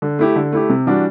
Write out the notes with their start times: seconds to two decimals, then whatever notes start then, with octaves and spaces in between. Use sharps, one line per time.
0.02 D3
0.19 A3 E4 G4
0.36 D3
0.52 A3 E4 G4
0.70 C3
0.86 E3 G3 D4 F#4